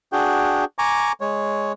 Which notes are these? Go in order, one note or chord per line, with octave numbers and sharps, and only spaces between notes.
D4 F#4 G#4 G5
G#5 A#5 C#6 D6
G#3 C#5